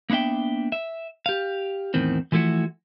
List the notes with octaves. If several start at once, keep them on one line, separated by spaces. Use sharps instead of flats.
A#3 B3 D4 E5 G5
E5
G4 F5
E2 A2 D#3 C4
E3 F3 A3 E4 F#4